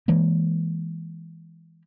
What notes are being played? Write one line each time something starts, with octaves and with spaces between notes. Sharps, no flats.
E3 G#3 A#3